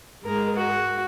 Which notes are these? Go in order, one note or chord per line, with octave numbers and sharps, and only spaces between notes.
G#2 G#3 A#4
F#4